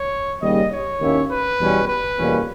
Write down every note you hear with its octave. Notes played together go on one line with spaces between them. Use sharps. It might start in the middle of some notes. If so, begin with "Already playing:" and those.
Already playing: C#5
D#2 C#3 G3 D#5
C#5
D#2 D#3 A#3 C#4 E4
B4
E2 B2 G3 C#4
B4
E2 B2 G3 A#3 C#4